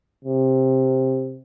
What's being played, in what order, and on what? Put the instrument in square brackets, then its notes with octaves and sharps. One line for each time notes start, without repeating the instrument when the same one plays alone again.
[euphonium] C3